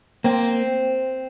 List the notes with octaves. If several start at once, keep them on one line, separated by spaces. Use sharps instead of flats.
A#3 C4